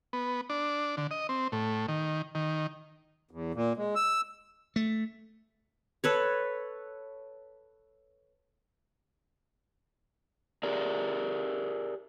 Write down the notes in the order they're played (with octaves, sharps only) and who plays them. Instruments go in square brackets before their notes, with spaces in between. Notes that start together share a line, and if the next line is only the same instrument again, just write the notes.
[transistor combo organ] B3
D4
D3
D#5
C4
A2
D#3
D#3
[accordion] E2
A#2
G#3
E6
[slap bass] A3
[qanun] A4 B4 C#5
[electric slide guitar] G4 G#4 A#4 D5